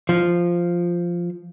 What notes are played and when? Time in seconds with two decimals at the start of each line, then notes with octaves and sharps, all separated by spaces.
0.09 F3